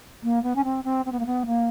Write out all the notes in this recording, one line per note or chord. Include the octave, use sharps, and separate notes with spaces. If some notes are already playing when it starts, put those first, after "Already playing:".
A#3
B3
C#4
C4
C4
C4
B3
A#3
B3
A#3